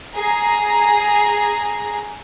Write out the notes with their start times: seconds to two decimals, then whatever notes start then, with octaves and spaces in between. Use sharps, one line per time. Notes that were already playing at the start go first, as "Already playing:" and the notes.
0.15 G#4 A#5